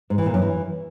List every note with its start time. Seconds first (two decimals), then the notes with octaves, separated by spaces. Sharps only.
0.10 G#2
0.18 E3
0.26 A#2
0.34 F#2
0.42 E3